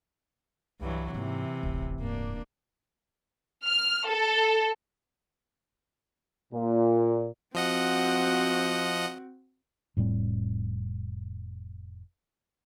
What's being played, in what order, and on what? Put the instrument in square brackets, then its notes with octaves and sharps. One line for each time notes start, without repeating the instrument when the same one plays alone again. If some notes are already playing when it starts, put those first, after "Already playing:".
[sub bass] C2 [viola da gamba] G2 E3 F#3
[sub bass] G#2 [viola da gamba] C3 E3 [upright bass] A#3 E4
[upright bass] D1 [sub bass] G1
[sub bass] G2 [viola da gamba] A#3 D4
[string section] F6
A4
[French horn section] A#2
[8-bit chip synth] F3 D#5 F#5 [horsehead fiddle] C4 F#4
[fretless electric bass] F1 A2 G3 C4